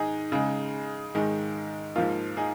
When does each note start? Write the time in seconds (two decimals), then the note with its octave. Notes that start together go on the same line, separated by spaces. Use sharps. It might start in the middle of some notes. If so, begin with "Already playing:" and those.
Already playing: G#2 D#3 D#4 G#4
0.32 C#3 G#3
1.15 G#2 D#3 G#3
1.96 G#2 F3 A#3 F4
2.37 D#4 G#4